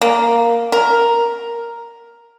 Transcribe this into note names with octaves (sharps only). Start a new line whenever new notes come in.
A#3
A#4